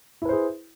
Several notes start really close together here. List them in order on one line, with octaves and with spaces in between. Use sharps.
E4 B4 C5 G#4